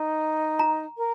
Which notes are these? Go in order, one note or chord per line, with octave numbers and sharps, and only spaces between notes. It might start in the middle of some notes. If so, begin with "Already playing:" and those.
Already playing: D#4
A#5
A#4